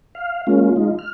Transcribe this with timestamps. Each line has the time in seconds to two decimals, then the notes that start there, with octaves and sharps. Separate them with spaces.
0.15 F5
0.47 G#3 A#3 C#4 F4
0.76 G#3 D#4 F4
0.99 F6